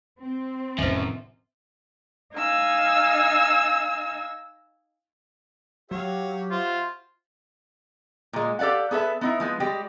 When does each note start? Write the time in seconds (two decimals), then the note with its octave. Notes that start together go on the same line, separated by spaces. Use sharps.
0.20 C4
0.78 F1 F#2 A2 D#3 C5 E5
2.34 D#4 F5 G#5 E6
5.91 F#3 F#4 G4 C#5 F5
6.51 F4 F#4 C5 E5
8.33 A#2 G#3
8.59 G4 A4 D5 F5 F#5
8.91 B3 G#4 A4 B4 E5
9.21 B3 D#4 E4
9.40 F3 G#3 B3
9.60 G3 G#3 F#4 G4